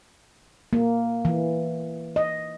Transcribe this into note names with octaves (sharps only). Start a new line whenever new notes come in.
A#3
E3
D#5